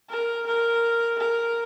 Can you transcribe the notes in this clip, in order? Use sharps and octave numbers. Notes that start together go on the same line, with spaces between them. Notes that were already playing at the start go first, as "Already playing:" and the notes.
A#4
A#4
A#4